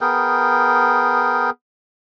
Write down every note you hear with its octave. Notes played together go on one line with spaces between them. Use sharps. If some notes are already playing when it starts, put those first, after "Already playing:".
B3 G#4 A#4 G5